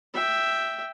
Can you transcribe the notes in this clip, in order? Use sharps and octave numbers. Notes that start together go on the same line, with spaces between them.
E5 G5